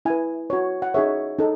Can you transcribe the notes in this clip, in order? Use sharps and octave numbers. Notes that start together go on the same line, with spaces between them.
E4 B4 G#5
F#4 C#5
F#5
D#4 G#4 C#5 E5
D#4 A4